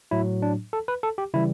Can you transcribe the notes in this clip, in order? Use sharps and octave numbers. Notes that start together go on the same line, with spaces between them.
A2 F#3 E4
D4
A4
B4
A4
G4
C#3 E3 G3 E4